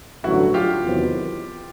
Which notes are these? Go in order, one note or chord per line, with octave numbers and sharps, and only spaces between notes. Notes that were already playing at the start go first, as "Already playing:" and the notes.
A1 G2 D3 F#3 A3 E4 F#4
F4 G4
E2 C3 D#3 F#3 B3